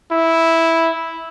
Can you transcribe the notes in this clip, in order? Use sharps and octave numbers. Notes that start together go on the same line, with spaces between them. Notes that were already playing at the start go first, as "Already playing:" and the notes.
E4